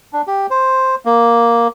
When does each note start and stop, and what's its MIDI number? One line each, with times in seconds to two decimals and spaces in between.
0.13 0.22 62
0.27 0.46 67
0.50 0.95 72
1.05 1.68 58